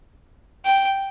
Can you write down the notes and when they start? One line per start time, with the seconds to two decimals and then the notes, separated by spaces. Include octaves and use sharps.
0.64 G5